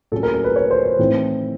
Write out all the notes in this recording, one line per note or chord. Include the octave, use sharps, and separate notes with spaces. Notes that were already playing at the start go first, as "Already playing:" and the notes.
A2 F#3 A#3 C#4 A4
A#4
A#4
B4
C#5
C5
C5
A2 E3 A3 C4 D#4